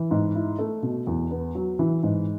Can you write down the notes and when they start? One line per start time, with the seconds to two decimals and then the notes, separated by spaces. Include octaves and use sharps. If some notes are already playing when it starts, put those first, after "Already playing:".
Already playing: E3
0.11 G#2
0.35 E4
0.59 A3
0.83 B2
1.07 E2
1.31 B3
1.55 F#3
1.79 E3
2.03 G#2